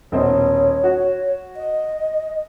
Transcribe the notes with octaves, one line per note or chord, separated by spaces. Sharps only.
D#1 B2 C5 C#5
F#4
D#5